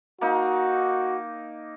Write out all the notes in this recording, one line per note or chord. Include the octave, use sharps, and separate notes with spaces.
A#3 D#4 F#4